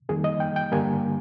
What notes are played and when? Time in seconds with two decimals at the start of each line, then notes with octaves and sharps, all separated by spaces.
0.09 F2 D#3 G3 A#3 G#4
0.24 D#5
0.40 G5
0.56 G5
0.72 G2 D3 G3 A#3 G#5